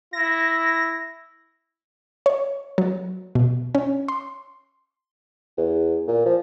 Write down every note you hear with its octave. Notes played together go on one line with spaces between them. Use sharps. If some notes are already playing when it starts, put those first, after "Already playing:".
E4 A#6
C#5
F#3
B2
C#4
C6
E2
A#2
F3